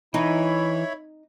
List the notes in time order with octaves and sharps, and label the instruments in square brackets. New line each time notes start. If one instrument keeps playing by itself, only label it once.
[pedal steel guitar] E3 [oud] D#4 [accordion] E4 C#5 B5